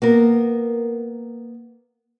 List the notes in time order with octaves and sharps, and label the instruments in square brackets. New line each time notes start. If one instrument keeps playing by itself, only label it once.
[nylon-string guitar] A#3 B3 A#4